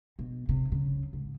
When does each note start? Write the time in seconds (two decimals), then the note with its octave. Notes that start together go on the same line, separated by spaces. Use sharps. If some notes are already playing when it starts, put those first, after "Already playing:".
0.19 B2
0.49 C3
0.72 C#3
1.13 G#2